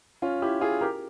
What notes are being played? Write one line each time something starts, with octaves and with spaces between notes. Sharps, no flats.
C#4 F4
E4 G4
F4 G#4
G4 A#4